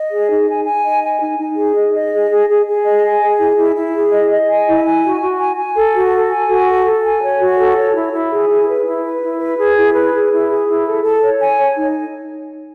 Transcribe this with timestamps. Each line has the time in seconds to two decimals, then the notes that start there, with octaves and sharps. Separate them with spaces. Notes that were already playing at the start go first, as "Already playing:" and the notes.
Already playing: D#5
0.11 G#4
0.31 D#4
0.48 G#5
0.66 G#5
0.85 D#5
1.03 G#5
1.21 D#4
1.39 D#4
1.57 G#4
1.76 D#5
1.94 D#5
2.13 G#4
2.31 G#4
2.48 G#4
2.66 G#4
2.85 D#5
3.03 G#5
3.21 G#4
3.39 E4
3.57 E4
3.76 E4
3.94 G#4
4.13 D#5
4.31 D#5
4.49 G#5
4.67 E4
4.84 G#5
5.04 F#4
5.21 F#4
5.40 G#5
5.58 G#5
5.76 A4
5.94 F#4
6.13 A4
6.31 G#5
6.49 F#4
6.68 A4
6.85 A4
7.03 G#5
7.22 C#5
7.40 F#4
7.58 A4
7.76 C#5
7.95 E4
8.12 E4
8.31 G#4
8.49 E4
8.67 B4
8.86 E4
9.04 B4
9.22 E4
9.40 B4
9.58 G#4
9.77 E4
9.94 B4
10.13 G#4
10.30 E4
10.49 G#4
10.68 E4
10.86 A4
11.03 A4
11.22 C#5
11.40 G#5
11.59 C#5
11.77 D#4